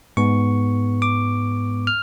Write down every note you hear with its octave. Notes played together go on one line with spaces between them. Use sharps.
G#2 G#3 B3 C#6
D6
F6